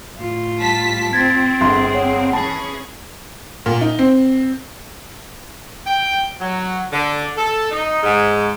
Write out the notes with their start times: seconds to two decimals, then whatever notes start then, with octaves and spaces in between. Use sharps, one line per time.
0.16 A2 F4
0.58 G3 A5 B6
1.13 C4 G#6 A6 B6
1.61 G1 G#4 E5 C6
1.94 C#5 F#5
2.33 E3 C#4 G#4 A5 B5
3.66 A#2
3.81 D#4
3.99 C4
5.86 G5
6.40 F#3
6.93 D3
7.37 A4
7.72 D#4
8.03 G#2